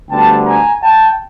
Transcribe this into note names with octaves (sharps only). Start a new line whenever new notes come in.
D2 D3 G3 B3 G5 A5
G#5 A#5
G5 A5